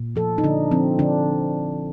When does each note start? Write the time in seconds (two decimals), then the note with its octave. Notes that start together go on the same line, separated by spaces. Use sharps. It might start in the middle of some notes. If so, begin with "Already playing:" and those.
Already playing: A#2
0.16 F3 A4
0.38 D#4
0.44 D3 D4
0.71 F3 C4
0.99 D3 D4